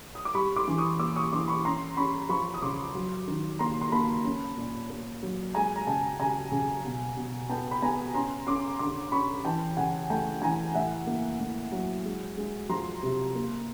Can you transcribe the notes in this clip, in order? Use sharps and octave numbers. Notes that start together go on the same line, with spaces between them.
D#6
D6
G3 B5 C#6
C6 D6
E3
C#6 D#6
A#3 D6 E6
C#6 D#6
E3 C6 D6
B5 C#6
C#4 A#5 C6
C#4 B5 C#6
F3 B5 C#6
D#6
C#3 C6 D6
F#3
D#3
A#3 A#5 C6
C6
A#3 A5 B5
C#4
A#2
A#3
F#3
G#3 G#5 A#5
A#5
C#3 G5 A5
C#3 G#5 A#5
C#3
B2
B2
B3 G5 A5
B5
B3 G#5 A#5
C#4 A#5 C6
C#4 C6 D6
D3 C6 D6
C#4 B5 C#6
E3 G5 A5
C#3 F#5 G#5
A3 G5 A5
E3 G#5 A#5
A2 E5 F#5
A#3
A2
F#3
G#3
G#3
F3 A#5 C6
C3
A#3